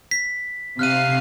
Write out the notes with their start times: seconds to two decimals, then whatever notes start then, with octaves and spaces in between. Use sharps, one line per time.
0.11 B6
0.79 C3 F5 F6 F#6 C7 D#7